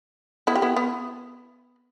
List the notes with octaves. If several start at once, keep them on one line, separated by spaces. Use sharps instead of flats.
B3 E4
G4
B3 E4
B3